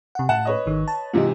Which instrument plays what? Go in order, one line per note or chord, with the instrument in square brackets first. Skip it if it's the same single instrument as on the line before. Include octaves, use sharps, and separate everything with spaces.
[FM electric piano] C3 F#5
[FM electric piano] A2 [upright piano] F#5 A5 E7
[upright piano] B4 C#5 D#5
[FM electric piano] G#1 D#3
A5
[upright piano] G#2 C3 E3 [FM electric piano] F4 D#5